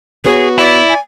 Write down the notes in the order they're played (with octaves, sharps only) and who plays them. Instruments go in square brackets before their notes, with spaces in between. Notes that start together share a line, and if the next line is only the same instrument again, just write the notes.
[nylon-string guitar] B3 B4 C#5 [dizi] F#4 [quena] G#4
[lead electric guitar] E4 [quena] D5
[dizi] G#5